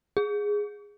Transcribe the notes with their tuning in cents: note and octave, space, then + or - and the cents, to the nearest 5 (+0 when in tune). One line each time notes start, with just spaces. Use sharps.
G#4 -5